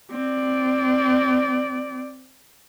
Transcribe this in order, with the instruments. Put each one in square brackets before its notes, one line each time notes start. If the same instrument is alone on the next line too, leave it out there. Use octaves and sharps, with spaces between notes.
[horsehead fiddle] C4 D5